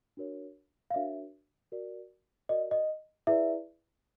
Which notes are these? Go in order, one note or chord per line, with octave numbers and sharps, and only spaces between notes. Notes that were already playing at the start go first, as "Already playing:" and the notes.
D4 F#4 A#4 C#5
F5
D4 F#4 A#4 C#5 E5
F#4 A#4 D5
F#4 A#4 D5 D#5
D#5
E4 G#4 B4 D5 E5